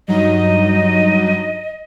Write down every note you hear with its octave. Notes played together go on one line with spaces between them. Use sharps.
G2 F#3 D#4 D#5